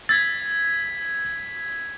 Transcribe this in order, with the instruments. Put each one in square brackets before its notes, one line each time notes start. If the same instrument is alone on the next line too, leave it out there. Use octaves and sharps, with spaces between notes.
[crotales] E6 G#6 B6 [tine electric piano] A6